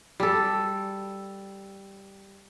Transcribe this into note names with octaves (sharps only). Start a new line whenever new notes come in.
G3 A4